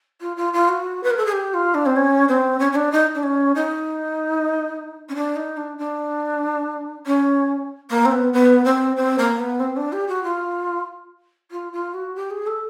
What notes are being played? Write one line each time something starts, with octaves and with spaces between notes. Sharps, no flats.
F4
F4
F4
F#4
B4
A#4
A4
G#4
G4
F4
D4
C4
C#4
C4
C#4
C#4
D4
D#4
D4
C#4
D#4
C#4
D4
D#4
D4
D4
C#4
A#3
C4
B3
B3
C4
C4
A#3
B3
C4
D4
G4
F#4
F4
F4
F4
F#4
G4
G#4
A4